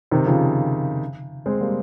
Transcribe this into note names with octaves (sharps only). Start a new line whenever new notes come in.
C3 D#3
C#3 F3
G#3 C4
G3 A#3